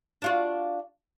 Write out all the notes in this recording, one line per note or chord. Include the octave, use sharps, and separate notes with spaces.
D4 F4 F#4